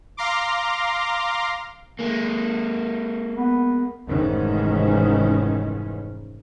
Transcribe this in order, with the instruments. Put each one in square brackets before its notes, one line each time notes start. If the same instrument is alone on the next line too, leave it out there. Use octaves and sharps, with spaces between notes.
[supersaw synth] F5 A#5 C6 D6
[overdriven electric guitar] G#3 A#3
[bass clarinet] B3
[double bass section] F1 G#2 D#3 E3 C#4